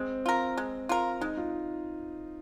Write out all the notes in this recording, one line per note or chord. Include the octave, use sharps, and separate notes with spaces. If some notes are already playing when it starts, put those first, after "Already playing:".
Already playing: G#3 C4
F4 A#4
G#3
F4 A#4
G#3 D#4
F4